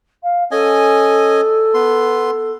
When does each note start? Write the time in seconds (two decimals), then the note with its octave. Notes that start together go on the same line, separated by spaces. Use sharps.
0.23 F5
0.51 C#4 A4 D#5 G#5
1.74 B3 C6